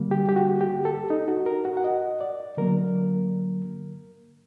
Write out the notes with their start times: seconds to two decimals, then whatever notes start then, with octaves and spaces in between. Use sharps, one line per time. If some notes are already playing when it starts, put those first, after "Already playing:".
Already playing: D3 G3 A#3
0.11 G4
0.29 G4
0.36 F#4
0.61 G4
0.85 A4
1.10 D#4
1.28 F#4
1.46 A#4
1.65 F#4
1.77 F#5
1.84 D#5
2.21 D5
2.57 D3 F#3 A#3 A#4